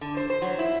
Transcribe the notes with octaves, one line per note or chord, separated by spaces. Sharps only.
D3
C5
C5
F#3
E4